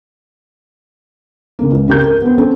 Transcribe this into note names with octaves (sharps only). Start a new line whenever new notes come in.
C#3 A#3
C#2
C#3 C4 G4 A#4 G6
A#4
B3 C4
C4 C#4 A4